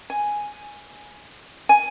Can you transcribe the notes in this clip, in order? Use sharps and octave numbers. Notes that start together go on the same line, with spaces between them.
G#5
G#5